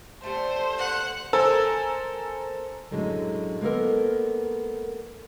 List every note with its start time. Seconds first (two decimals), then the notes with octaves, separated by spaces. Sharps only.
0.23 D3 G3 A3 C5
0.78 F#5
1.33 A4 A#4 C5 G#5 E6
2.91 F#2 A2 D3 F#3 G#3
3.61 G#3 A#3 B3 A4 A#4